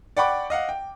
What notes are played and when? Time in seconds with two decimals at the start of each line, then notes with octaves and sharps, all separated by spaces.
0.17 D5 F#5 G5 B5 C#6 D6
0.50 D#5 F5 F#5
0.69 G5